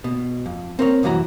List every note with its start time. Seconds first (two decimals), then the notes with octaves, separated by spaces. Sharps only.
0.04 B2
0.46 F2
0.79 C4 A#4 C#5
1.03 C2 F#2 E3 F#4 A#5